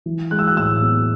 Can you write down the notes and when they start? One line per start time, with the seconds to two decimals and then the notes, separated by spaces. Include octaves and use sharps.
0.06 E3
0.31 G#3 F#6
0.39 E6
0.47 F#6
0.57 A2 E6
0.82 B3